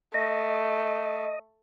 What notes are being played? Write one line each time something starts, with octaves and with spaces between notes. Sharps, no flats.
A3 D#5